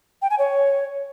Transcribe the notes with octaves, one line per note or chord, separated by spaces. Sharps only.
G5
G#5
C#5